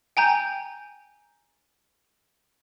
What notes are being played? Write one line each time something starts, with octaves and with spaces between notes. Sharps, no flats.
G5 G#5 A#5 G6